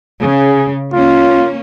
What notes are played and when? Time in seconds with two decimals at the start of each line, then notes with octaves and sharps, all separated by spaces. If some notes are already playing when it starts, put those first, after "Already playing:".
0.22 C#3 G#4
0.93 A#3 C#4 F4